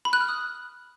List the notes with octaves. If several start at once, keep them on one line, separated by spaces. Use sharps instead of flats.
B5
F#6
F6
D#6